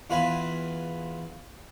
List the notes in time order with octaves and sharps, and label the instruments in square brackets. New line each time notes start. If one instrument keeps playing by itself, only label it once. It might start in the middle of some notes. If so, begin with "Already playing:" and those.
[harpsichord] E2 F4 B4 G#5